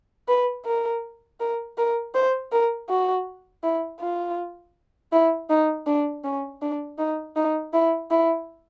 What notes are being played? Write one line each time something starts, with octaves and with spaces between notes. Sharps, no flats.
B4
A#4
A#4
A#4
C5
A#4
F#4
E4
F4
E4
D#4
D4
C#4
D4
D#4
D#4
E4
E4